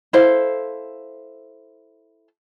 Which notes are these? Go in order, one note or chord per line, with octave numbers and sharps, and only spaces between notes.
E4 A4 C5 F5